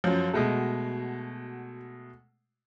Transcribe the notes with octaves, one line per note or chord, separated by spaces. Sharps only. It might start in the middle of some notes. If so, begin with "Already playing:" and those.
F#2 F3 F#3
B2 G#3 A3 F#4